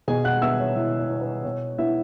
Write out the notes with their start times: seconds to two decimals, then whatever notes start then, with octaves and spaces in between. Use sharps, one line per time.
0.08 B2 G#4 G#5
0.24 F#5 F#6
0.42 B3 E5 E6
0.60 C#5
0.76 B2 E4 E5
1.00 C#5
1.10 B3
1.17 C#5
1.21 B4
1.44 B2 C#5
1.78 B3 E4 E5